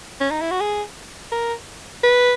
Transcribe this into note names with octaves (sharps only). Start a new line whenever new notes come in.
C#4
D#4
E4
F#4
G#4
A#4
B4